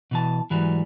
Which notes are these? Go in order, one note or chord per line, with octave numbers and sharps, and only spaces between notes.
B2 E3 A5
G#2 E3 F#3 G3